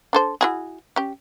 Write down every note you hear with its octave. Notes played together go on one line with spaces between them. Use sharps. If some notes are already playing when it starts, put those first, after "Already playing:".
D4 A4 C5
E4 F#4 G#4
C#4 G4